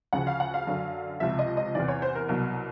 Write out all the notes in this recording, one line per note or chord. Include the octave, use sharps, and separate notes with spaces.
D2 C#3 F3 F#5
F5
F#5
F5
F#2 D3 F#3
C#2 C3 F3 E5
D#5
D#5
E2 C3 E3 D5
C#5
C5
A#4
C2 B2 F#3